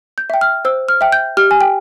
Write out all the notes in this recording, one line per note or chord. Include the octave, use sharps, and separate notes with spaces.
G6
E5 G5
F6
C5 E6
F6
E5 G5
G6
G4 F6
G#5
G5